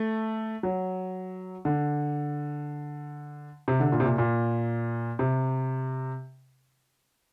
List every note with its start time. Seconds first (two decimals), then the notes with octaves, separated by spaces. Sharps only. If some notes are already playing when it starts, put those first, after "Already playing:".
Already playing: A3
0.63 F#3
1.65 D3
3.68 C3
3.80 D3
3.92 A#2
4.00 C3
4.05 A#2
4.18 A#2
5.19 C3